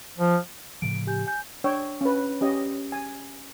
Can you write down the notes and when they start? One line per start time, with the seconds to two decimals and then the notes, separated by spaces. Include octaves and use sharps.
0.18 F3
0.82 A2 C#3 F3 D7
1.07 G4 G#5 G6
1.27 G#5 G6
1.64 D4 C#5 G5 E6
2.01 C#4 B4
2.41 C#4 G4 D#5
2.92 G#5